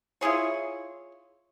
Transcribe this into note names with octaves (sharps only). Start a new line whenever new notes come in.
E4 F4 G#4 C#5